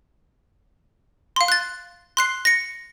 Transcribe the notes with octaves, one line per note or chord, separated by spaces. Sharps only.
F5 C6
F#6 A6
C6 F#6 C7
A#6 C#7